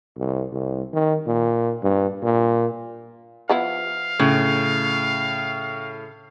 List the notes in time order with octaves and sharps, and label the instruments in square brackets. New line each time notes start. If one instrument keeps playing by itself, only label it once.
[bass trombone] C2
C2
D#3
A#2
G2
A#2
[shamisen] F3 B3 E4 [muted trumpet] F5
[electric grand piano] A2 [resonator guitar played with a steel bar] C#3